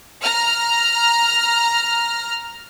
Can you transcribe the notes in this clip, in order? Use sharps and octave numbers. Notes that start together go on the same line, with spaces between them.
A#5 F6